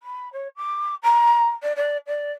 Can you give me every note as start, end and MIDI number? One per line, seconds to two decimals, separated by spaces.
0.03 0.31 83
0.33 0.48 73
0.56 0.95 86
1.03 1.49 82
1.62 1.72 74
1.76 1.97 74
2.07 2.31 74